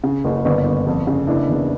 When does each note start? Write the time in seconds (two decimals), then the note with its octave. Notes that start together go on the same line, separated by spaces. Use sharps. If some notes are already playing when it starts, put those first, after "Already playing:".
0.03 C#3
0.24 F#1
0.45 G1
0.66 G1
0.87 F2
1.07 C#3
1.27 F#1 D4 E4
1.49 E2